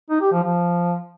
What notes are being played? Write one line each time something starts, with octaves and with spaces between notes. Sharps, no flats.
D#4
G4
F3
F3